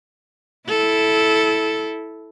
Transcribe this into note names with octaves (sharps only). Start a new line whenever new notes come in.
E4 A4